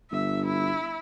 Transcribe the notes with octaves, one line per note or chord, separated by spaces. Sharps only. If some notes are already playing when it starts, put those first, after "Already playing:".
G1 E5
E4